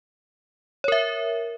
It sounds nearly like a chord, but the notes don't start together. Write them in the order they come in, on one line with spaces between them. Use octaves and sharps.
C#5 A#4 E5